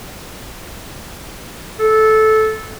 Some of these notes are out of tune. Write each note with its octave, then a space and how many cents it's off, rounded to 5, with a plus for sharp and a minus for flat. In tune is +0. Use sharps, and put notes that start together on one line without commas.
A4 -15